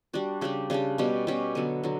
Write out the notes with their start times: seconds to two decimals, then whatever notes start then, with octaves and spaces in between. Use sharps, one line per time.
0.13 G3 D4 F#4
0.41 C#3 G3 D4 G4
0.70 C#3 G3 D4 G4
0.98 B2 G3 C#4 G4
1.27 B2 G3 C#4 G4
1.55 D3 F#3 B3
1.84 D3 F#3